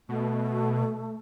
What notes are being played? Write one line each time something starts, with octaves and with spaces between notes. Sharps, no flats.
B2 A3